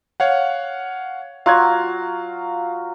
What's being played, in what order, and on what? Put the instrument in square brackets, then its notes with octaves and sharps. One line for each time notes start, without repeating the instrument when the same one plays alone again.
[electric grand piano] C#5 F5 F#5
[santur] F#3 F4 [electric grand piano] F5 F#6 G#6